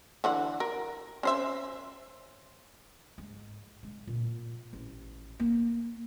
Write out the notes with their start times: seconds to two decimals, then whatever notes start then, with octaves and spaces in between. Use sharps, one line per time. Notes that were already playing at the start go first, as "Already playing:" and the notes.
0.24 D3 E3 F#5
0.60 A#4
1.23 C#4 C5 E5
3.18 G#2
3.83 G#3
4.07 A#2
4.73 A1
5.40 A#3